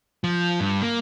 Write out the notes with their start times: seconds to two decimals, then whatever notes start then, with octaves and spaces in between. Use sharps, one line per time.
0.24 F3
0.60 G2
0.82 A#3